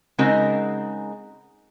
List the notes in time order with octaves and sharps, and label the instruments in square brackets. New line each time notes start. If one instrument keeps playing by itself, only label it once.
[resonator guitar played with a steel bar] C#3 G#3 C4 D#4 F#4 A#4